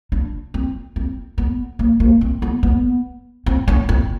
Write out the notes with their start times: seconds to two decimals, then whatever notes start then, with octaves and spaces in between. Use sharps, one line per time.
0.12 D4
0.54 C4
0.96 C4
1.38 B3
1.79 A#3
2.00 A#3
2.21 C4
2.42 B3
2.63 B3
3.46 C4
3.68 C#4
3.89 C4